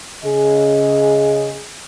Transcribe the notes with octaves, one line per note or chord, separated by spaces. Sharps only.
C#3 G#4 D#5